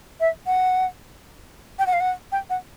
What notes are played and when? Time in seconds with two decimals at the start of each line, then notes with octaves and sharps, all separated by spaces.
0.20 E5
0.47 F#5
1.79 G5
1.87 F#5
1.93 F5
2.00 F#5
2.32 G5
2.50 F#5